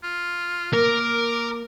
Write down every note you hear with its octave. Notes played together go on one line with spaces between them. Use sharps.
F4
A#3 A#4 D6